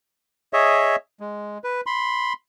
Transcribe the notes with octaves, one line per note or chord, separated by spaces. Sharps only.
G#4 C#5 D#5 E5
G#3
B4
B5 C6